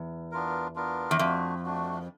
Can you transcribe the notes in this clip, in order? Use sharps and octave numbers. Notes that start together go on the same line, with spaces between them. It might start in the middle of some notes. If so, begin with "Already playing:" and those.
Already playing: E2
B3 D4 F4 A#4
B3 D4 F4 A#4
E2
F2 A3 D4 F#4
A3 D4 F#4